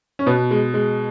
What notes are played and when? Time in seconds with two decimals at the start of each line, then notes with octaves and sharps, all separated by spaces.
0.19 C#4
0.26 B2 B3
0.51 G#3
0.74 G#3